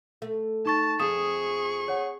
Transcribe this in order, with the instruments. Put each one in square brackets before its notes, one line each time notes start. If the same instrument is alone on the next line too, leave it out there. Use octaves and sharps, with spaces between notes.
[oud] A3
[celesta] D#4 C#6 A6 [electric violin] A5
[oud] F2 [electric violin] G#4 C#6 [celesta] D#6 E7
[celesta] C#5 F#5